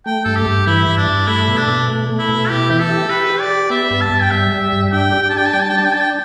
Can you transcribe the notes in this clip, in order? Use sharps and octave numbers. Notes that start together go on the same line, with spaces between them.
A3 G5
G2 A4
G4
G2
E3 E4
G2
D4
G2
A3 E4
B2
D4
B2
A3
A3
E4
B2
E4 G4
E3 G4
A4
G4
G4 B4
G4
D5
G4
B3 E5
G2
A5
G2
G5
G3 E5
G3
G2
D4 G5
G4
G5
A5
D4
G5
A5
G3 G5
A5
G5
D4 A5
G5
D4 A5
G5